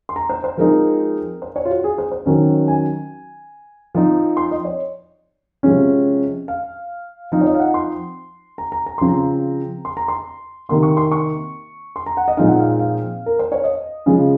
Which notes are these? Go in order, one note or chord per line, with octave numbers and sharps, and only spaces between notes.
C6
A#5
C5
C5
F3 G#3 C4 D#4 A#4
C5
C#5
F4
F#4
G#4
C5
C5
D#3 F#3 C#4
G#5
F3 C4 D#4
C6
D#5
C#5
C3 F3 G#3 C#4
F5
F3 C4 D#4 F5
C#5
D#5
F5
F#5
C6
A#5
A#5
A#5
C#3 F3 C4 C6
A#5
C6
A#5
C6
C3 D#3 A#3 C6
C#6
C6
C#6
C6
A#5
F#5
D#5
A#2 F3 G#3 C4 D#4 F5
F#5
F5
F5
A#4
C5
C#5
D#5
C#3 F3 G#3